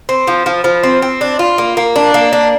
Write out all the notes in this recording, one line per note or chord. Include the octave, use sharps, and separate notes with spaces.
C4
F3
F3
F3
C4
C4
D4
F4
A#3
A#3
D4
A#3
D4